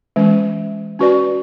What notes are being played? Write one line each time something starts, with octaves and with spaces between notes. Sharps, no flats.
E3 G#3 C#4
C#4 F#4 B4 D5